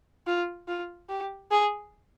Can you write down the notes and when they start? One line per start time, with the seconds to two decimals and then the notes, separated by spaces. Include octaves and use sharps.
0.27 F4
0.68 F4
1.09 G4
1.51 G#4